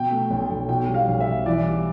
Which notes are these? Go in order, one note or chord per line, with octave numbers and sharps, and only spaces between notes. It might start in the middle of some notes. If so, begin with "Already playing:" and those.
Already playing: B2 G5
A3
B1
B1
B2 G5
G3
F5
B1
E5
B1
E3 D5
G3